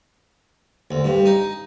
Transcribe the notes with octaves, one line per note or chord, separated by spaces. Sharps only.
D2
G2
D#4